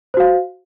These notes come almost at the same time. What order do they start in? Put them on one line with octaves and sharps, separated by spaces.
C5 F#4 F5